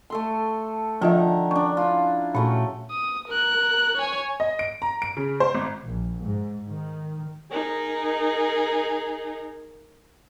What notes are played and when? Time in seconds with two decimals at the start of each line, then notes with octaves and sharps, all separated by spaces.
0.10 A3 A4 C6
1.01 D3 D#3 F3 F4 E5 A#5
1.51 C#4 D4 C#6
1.77 E4 F4
2.35 A#2 F#3 A3 C#4
2.91 D#6
3.28 A#4 F#6
3.97 C#5 G#5
4.40 D#5
4.59 D7
4.82 A#5
5.02 D7
5.17 C#3
5.40 C5
5.54 G#1
5.85 A#1
6.24 G#2
6.70 D#3
7.51 D#4 G#4 A#4